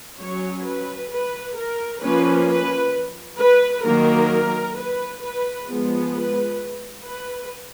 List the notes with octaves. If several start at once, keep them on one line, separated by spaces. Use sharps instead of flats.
F#3 C#4 C#5
B4
B4
A#4
F3 A#3 C#4 B4
B4
B4
D#3 F#3 A#3 A#4
B4
B4
F3 G#3 B3
B4
B4